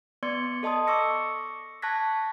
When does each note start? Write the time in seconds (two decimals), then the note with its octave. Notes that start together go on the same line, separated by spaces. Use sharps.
0.23 B3 D5 C6 G#6 C#7
0.63 A4 D#5 A5 C6 D#6
0.87 C#6 D6 E6 A#6 C#7
1.82 A5 C#6 F#6 G#6 A#6 B6